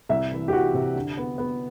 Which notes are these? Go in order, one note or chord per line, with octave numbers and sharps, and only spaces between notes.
C2 E5
E3
G4
E3 F#4
C3
D3
B3
B3